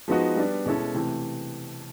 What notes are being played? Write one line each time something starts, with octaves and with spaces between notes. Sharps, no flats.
F3 G#3 B3 D#4 F#4
G3 B3 D4
B2 G#3 C#4 E4 A4
C3 E3 A3